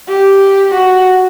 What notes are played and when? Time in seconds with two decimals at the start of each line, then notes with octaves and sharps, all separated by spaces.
0.09 G4
0.75 F#4